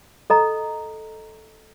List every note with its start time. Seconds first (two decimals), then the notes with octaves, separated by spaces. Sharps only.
0.30 A4 D#5 A#5